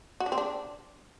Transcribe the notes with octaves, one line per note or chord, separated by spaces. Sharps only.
F#4
D4
C4
D4